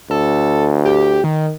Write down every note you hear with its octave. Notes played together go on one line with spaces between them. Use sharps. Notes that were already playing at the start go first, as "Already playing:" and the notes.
D2 A4
G4
D#3